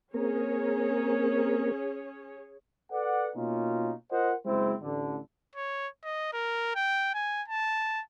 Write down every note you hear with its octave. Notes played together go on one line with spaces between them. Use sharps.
A#3 C4 C#4 G#4 A#4 C#5
A4 B4 D5 F#5
B2 A#3 C#4 D#4 F4
F4 A#4 C5 D#5 F#5
F#1 G#3 C4 E4 C5
A1 D3
C#5
D#5
A#4
G5
G#5
A5